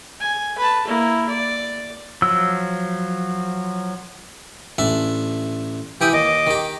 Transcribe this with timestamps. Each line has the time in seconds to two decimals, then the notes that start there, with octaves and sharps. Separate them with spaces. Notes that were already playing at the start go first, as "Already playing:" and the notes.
0.20 G#5
0.58 B4 A5
0.87 A#3 E4
1.29 D5
2.22 F3 F#3 E6
4.78 A1 D4 E5
6.01 E3 E4 G4 G5 D#6
6.13 D#2 D#5 D6
6.47 D#3 G4